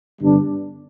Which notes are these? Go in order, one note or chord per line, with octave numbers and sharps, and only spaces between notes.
G2 D3 G3 B3 D4